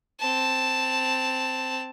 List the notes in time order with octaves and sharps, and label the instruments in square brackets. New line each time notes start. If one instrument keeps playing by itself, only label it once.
[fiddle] C4 A5